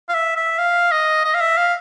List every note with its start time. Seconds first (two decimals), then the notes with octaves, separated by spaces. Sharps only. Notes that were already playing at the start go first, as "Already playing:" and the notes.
0.09 F5
0.14 E5
0.36 E5
0.59 F5
0.91 D#5
1.24 D#5
1.35 F5
1.41 E5
1.57 F5